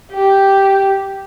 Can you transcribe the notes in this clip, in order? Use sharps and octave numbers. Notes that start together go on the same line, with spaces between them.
G4